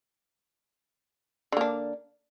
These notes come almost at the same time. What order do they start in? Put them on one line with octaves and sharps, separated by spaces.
D3 A#3 D4